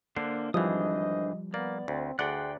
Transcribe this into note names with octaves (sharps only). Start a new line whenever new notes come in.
D3 A#3 D4 C5
G#1 E3 F3 G3 D4 C5 D#5 D#6
A#3 B3 D5
D2 C4
D2 G#4 D5 F#5 G5 C6 F#6